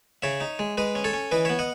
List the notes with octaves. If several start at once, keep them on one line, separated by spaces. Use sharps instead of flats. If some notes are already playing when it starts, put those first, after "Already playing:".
C#3 C#5 E5
D#4
G#3
G#3 B4 D#5
C#4
A4 C#5
C#4
E3 B4 D#5
B3 C#5 E5
D#5 F#5